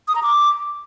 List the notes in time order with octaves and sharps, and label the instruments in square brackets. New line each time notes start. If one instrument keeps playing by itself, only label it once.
[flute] D#6
A#5
D6